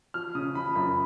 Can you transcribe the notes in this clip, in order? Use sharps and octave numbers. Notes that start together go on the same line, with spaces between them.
F3 F6
C#3 D#6
F3 B5
F#2 B5